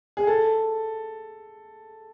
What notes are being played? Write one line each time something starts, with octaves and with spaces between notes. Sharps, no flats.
G#4
A4